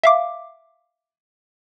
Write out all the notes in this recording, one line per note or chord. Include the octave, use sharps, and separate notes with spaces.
E5 F5 D6